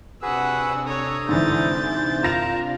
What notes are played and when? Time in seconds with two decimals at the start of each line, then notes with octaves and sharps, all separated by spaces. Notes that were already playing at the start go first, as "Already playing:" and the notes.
0.22 C3 D4 F#4 G#4 B4 F#5 E6
0.86 A4 C#5 A#5 D#6
1.29 G#2 D3 E3 G6 A6
2.23 F4 A#4 A5 A#5 A#6 F7